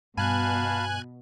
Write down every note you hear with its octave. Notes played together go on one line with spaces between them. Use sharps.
G2 B2 F5 G#5 A5 B5 F#6 G#6